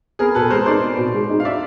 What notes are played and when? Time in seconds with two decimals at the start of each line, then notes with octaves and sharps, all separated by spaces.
0.19 B3 G#4 A#4
0.35 B2 A4 B4
0.50 G#3 A#4 C5
0.66 D#4 C5 D5
0.82 B3
0.98 B2
1.14 G#3
1.29 D#4
1.40 F5
1.45 D4 D5 E5